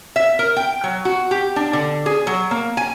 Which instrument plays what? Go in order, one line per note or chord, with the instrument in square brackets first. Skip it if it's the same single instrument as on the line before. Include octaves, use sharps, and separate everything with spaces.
[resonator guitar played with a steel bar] E5
A#4
G5
F#3
F#4
G4
D4
D3
G#4
F#3
A#3
G#5